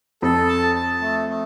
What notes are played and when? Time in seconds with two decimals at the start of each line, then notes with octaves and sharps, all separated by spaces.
0.22 F2 A4
0.49 A5
0.75 A5
1.01 A3
1.28 A3